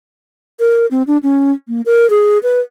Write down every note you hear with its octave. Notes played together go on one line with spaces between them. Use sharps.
A#4
C4
D4
C#4
A#3
A#4
G#4
B4